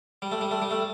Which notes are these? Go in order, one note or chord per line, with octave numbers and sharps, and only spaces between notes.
G3
A3
G3
A3
G3
A3